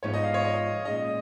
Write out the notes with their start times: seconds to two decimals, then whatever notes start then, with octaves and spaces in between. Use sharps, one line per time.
0.03 G#2 F3 B3 D#4 C#5
0.14 D#5
0.24 F5
0.34 C#5
0.44 D#5
0.85 A#2 G#3 C#4 D#5